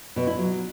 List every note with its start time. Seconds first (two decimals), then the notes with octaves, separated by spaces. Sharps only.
0.16 B2
0.27 E4
0.38 F#3